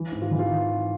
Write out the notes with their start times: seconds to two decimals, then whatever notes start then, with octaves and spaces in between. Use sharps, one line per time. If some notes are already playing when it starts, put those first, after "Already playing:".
Already playing: E3
0.12 G#2
0.22 F4
0.31 E3
0.39 F4